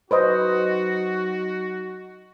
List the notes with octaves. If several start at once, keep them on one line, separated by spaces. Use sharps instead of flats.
F#3 D#4 F#4 B4 C5 D#5